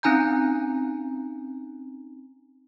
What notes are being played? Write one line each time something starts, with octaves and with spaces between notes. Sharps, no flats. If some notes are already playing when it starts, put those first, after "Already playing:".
C4 C#4 D#4 G#5 A#5 G6